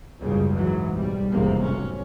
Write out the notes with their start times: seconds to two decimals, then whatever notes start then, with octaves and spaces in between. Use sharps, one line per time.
0.21 F#1 C#2 G#2 C#3 G3
0.56 G#2 E3 F#3
0.95 B1 G3
1.32 F1 E2 G#2 C3 A#3
1.64 B1 C#4